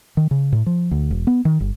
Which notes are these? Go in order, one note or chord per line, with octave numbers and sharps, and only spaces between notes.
D#3
C#3
A2
F3
D2
E1
B3
D#3
G1